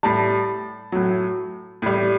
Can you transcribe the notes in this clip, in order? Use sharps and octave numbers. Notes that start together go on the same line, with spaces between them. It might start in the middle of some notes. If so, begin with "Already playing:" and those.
A2 G3 A5
A2 F#3
A2 G3